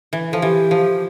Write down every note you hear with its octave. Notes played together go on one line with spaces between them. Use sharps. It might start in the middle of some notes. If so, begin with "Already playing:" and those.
E3
F3 A4
E3 G4
F3